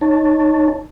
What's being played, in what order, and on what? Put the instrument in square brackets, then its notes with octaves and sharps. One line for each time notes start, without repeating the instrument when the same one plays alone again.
[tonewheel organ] D#4 C#5 A5